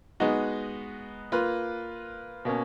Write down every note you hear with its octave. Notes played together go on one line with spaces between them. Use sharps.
G#3 B3 D#4 F#4
A#3 F4 B4
B2 A#3 C#4